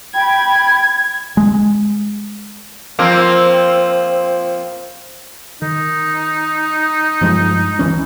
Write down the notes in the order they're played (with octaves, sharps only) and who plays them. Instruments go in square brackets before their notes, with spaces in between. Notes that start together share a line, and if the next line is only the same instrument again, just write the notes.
[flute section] G5 B5 [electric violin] G#6
[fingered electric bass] G#3
[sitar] F3 A#3 C4
[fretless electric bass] D#3 [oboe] D#4
[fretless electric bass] G2 F3 G#3
C#2 E3 C#4